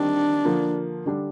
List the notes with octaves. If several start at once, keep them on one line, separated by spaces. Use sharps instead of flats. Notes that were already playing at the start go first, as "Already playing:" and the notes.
Already playing: D#3 G3 C4 D4
D3 F3 A#3 F4
D3 G3 D4